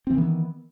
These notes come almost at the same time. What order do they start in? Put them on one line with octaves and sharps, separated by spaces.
C4 E3 D#3 B3